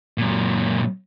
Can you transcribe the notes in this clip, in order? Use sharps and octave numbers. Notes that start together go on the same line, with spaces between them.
F#2 A#2